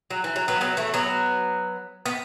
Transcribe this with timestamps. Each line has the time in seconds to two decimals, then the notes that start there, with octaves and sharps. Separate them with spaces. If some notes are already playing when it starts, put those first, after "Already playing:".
0.11 F#3
0.24 E3
0.36 F#3
0.48 F#3 B3
0.61 F#3 B3
0.77 E3 A3
0.94 F#3 B3
2.06 B3